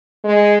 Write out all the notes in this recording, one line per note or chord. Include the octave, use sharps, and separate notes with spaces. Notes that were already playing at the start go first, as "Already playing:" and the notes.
G#3